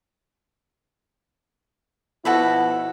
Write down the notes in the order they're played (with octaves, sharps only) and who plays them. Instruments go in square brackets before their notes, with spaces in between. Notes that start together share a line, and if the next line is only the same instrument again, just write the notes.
[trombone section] B2 F3 E4 [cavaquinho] F#4 A4 B5